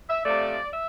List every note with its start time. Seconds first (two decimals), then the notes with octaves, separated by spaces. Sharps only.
0.08 E5
0.24 C3 F3 A3 D5
0.72 E5